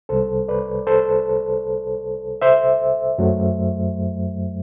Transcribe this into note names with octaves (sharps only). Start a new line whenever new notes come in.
C2 C3 G3 A4 C5
B4 D5
A4 C5
C5 E5
F#2 F#3 A3